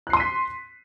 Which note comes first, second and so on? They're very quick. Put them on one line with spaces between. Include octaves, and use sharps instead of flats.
F#6 C7 C6 D#7 B6